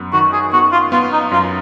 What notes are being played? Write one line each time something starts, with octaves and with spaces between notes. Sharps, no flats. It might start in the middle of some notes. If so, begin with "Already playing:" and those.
Already playing: F#2 B3
D#3 F#4
G#4
B3 F#4
F4
B3 F4
D#4
F#2 F4